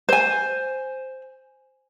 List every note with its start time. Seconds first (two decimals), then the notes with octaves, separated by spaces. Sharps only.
0.09 C5 G#5